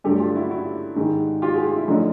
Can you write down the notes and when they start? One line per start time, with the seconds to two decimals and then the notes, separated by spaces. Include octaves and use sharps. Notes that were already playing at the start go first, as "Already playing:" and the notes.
0.04 G2 D3 F#3 A3 G4 A4
0.20 F4 G4
0.35 E4 F#4
0.50 E4 F#4
0.96 G#2 D#3 G#3
1.42 F4 G4
1.53 F#4 G#4
1.65 F4 G4
1.76 E4
1.87 F#2 D3 F3 A3 D#4